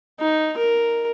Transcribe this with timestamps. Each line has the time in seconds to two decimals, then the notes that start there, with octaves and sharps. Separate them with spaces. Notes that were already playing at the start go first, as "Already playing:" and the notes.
0.20 D#4
0.58 A#4